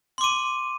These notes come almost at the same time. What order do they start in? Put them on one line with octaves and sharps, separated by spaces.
C6 D6 D#7